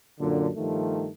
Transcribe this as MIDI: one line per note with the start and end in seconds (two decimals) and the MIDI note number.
0.19 0.48 42
0.19 0.48 46
0.19 0.48 50
0.56 1.08 43
0.56 1.08 51
0.56 1.08 53
0.56 1.08 57